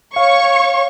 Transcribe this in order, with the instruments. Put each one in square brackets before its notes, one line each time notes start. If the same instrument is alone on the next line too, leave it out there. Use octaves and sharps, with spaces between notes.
[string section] C#5 C#6 [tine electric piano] F5